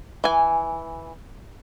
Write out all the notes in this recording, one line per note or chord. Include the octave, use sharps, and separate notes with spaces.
E3 G#5